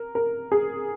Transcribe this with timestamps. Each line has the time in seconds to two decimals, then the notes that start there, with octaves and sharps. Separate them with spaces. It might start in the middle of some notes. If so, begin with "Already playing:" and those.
Already playing: A#4
0.15 A#4
0.52 G#4